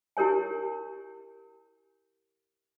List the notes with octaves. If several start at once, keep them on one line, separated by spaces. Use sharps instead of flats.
E4 G4 A#4 C#5 G#5